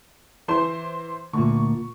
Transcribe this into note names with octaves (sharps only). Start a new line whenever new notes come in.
E3 C5 C6
D2 A#2 C#6